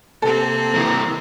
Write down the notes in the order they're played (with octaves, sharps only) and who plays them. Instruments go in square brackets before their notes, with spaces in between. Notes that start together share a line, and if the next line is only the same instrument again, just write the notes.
[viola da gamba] C3 A#3 C4 [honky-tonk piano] A4
[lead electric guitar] E3 A#4